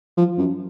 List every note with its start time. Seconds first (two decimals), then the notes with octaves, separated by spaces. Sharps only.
0.17 F3
0.38 F#2